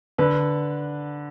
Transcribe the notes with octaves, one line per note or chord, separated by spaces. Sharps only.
D3 B4